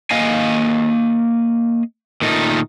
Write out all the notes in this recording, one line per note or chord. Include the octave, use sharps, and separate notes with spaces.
A#3 D#5 F5 G#5
A#2 D#3 A3 D#4